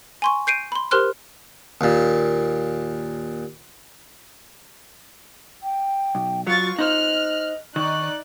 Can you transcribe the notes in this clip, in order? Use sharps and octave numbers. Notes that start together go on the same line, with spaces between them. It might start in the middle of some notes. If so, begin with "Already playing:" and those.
G#5 C6 C#6
G6 C7 D7 D#7
B5 C6
G4 A#4 C5 C6 F6 F#6
D#2 A#2
G5
B1
F#3 F4 F#4 C#6 A6
D#4 C5 D#5 F6 F#6
D#3 D#4 D5 C#6 F#6